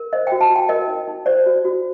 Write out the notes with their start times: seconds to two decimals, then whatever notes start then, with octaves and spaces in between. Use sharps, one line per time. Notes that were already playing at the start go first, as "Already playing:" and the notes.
Already playing: A#4
0.13 C5 D#5
0.27 F#4 G5
0.41 A5
0.50 F#4
0.56 G5
0.69 A#4 D#5
0.88 D#4
1.08 D#4
1.26 C5 D5
1.46 F#4
1.65 F#4